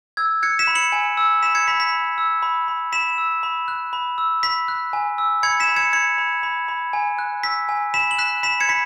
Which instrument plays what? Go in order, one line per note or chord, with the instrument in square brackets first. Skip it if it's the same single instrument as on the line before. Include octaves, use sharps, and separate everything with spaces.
[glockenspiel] E6 G#6
F#6 G#6 C#7
B6 E7
B5
C#7 F#7
G#5
E6
B5 B6 E7
G#6 C#7
B5 B6
B6
B5
E6
B5
B5
B5 B6 E7
E6
B5
F#6
B5
E6
B5 B6
F#6
G#5
E6
B5 G#6 C#7
B6 E7
B5
G#6 C#7
B5 G#6 C#7
B5
B5
B5
G#5
F#6
E6 B6
G#5
B5 B6 E7
F#7
F#6 B6 E7
B5 B6 E7
G#6 C#7
B5 B6